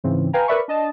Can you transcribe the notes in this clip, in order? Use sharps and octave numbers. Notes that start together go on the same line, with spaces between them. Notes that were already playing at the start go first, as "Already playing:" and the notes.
G#2 C#3 E3 C4
B4 F5 G5 G#5 A#5
A#4 B4 D5 E5 B5 C#6
D4 D#5 A5